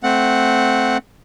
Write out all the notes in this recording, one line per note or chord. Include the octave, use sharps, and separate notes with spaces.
A3 C4 F#5